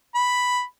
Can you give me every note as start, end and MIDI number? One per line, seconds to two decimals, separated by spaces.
0.15 0.62 83